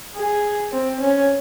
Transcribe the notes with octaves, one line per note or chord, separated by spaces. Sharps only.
G#4
C4
C#4